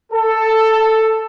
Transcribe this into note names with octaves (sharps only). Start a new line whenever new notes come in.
A4